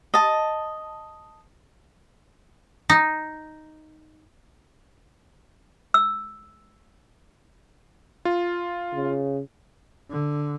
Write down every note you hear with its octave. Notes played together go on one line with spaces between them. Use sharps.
D#5 A5
D#4
E6
F4
C#3
D3